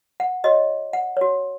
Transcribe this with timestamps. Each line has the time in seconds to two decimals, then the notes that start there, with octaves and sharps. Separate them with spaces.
0.20 F#5
0.44 F#4 C#5 D#5
0.93 F#5
1.17 F#4 C#5